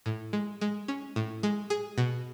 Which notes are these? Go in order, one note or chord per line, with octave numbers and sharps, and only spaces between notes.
A2
G#3
G#3
C#4
A2
G#3
G#4
B2